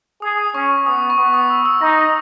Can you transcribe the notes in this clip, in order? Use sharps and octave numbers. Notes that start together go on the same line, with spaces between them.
G#4 D#6
D#6
D#6
C#4 C#6
B3 D#6
C#6
B3 D#6
D#6
E6
E6
D#4 A#6